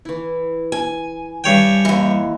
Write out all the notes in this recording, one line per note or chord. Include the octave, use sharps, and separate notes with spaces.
E3 E4
G#5
G2 C#5 G5
D#2 E3 A#4